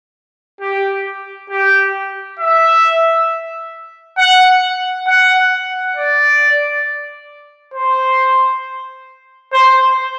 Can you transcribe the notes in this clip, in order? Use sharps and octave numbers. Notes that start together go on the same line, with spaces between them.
G4
G4
E5
F#5
F#5
D5
C5
C5